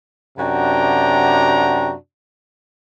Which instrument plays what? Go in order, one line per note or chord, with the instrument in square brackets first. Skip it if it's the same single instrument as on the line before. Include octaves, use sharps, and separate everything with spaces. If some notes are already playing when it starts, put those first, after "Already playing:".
[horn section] F#2 C3 D4 F#4 G5 A#5